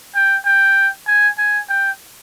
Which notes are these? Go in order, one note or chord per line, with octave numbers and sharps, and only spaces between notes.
G5
G5
G#5
G#5
G5